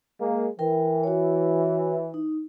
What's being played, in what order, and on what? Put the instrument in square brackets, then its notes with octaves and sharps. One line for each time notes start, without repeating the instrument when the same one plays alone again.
[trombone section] G#3 A#3
[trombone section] E3 [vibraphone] A#4 G5
[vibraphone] F#4 C#5
D#4